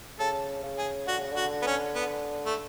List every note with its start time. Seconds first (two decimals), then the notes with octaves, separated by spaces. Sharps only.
0.20 C#3 A4
0.63 C#3
0.78 G#4
1.07 D3 F#4
1.19 C#3
1.31 D3
1.36 F#4
1.62 B3
1.66 C#4
1.95 B3
2.46 A3